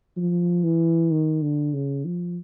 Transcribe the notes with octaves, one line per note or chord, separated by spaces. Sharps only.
F3
E3
D#3
D3
C#3
F3